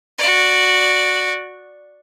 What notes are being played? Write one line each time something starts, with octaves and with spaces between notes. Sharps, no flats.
F#4 D5